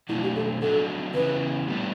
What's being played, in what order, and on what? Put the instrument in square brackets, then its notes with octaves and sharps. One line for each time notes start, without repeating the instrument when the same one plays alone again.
[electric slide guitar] B2 F#3 A3 D4 [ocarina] E4
[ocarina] G4
A4
[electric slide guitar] D3 F#3 B3 D4 [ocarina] A4
[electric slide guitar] C#3 E3 B3 [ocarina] B4
[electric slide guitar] A2 G3 B3 D4